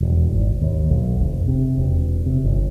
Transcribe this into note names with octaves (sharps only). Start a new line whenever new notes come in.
E1
G#1
D#2
B1
F1
C3
E1
C3
G1